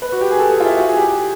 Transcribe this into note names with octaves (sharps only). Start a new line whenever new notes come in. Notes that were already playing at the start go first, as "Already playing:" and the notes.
B4
F#4
G4
G#4
A4
G#4
F4
E4
F#4
G#4
G4